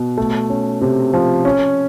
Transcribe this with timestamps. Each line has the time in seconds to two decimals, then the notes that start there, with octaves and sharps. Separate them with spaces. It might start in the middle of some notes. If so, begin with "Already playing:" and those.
Already playing: B2
0.17 A3
0.50 C#4
0.81 C3
1.13 F3
1.45 C#4